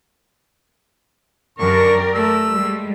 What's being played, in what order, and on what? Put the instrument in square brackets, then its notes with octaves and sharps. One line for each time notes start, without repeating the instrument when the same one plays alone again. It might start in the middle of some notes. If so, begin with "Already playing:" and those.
[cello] F#2 [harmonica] D3 D4 C#6 [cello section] G4 A#4 D5
[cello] A3 [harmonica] E6
[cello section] G3 G#3